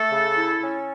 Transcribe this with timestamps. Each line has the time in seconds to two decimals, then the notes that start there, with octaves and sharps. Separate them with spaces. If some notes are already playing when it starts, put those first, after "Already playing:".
Already playing: A3 A4
0.11 C#3
0.36 E4
0.62 C#4